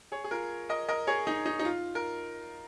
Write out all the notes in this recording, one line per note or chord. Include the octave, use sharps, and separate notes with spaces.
G#4 C#5
G#4
F4 A#4
A#4 D#5
A#4 D#5
G#4 C#5
D#4 G#4
D#4
D#4
F4
A#4